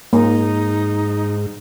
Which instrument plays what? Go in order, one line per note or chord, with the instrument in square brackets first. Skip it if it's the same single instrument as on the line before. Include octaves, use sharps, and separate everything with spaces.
[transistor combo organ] G#2 [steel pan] A#3 [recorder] D#4